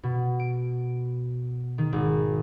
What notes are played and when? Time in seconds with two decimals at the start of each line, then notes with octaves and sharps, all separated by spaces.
0.03 B2
0.40 D7
1.78 D#3
1.93 G#1